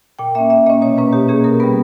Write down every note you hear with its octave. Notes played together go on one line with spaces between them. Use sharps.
A#2 G5
A#3 C#4 E5
A#2 E5
A#3 C#4 D#5
B2 C#5
A#3 C#4 B4
B2 G4
A#3 C#4 G#4
B2 A#4
G3 B3 B4